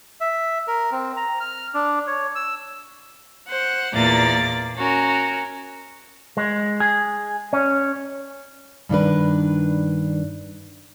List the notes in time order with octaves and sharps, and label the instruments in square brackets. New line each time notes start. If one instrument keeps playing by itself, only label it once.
[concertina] E5
A#4
C4
A#5
F6
D4
C#5
E6
[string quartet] C5 F#5
E2 A#2 A#3 D5 A#5 A6
C#4 F#4 A#4
[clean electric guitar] G#3
G#4
C#4
[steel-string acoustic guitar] G2 D#3 D4 B4